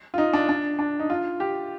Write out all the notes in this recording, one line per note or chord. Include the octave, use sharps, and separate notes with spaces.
F4
D#4
D4
D4
D4
D#4
F4
G4